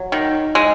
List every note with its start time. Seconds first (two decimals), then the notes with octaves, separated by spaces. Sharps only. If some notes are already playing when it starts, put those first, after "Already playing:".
Already playing: F#3
0.12 D#3
0.55 G#3